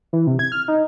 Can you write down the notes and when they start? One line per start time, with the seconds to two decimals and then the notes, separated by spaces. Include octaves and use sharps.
0.13 E3
0.27 C3
0.39 G#6
0.52 F6
0.68 D#4